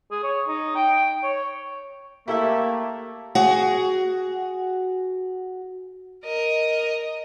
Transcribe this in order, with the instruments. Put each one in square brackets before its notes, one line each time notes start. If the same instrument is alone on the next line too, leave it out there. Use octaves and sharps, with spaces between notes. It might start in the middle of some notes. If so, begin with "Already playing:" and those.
[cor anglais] G#4
C#5
D#4
G5
C#5
[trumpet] A3 [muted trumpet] A#3 [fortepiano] E4 [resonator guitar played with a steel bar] G4 A4 E5
[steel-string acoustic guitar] F#4 G#4
[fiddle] A#4 D#5